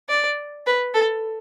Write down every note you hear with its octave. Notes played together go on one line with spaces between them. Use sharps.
D5
B4
A4